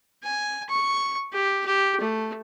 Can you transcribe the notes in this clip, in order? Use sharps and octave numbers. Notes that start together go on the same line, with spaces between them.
G#5
C#6
G4
G4
A3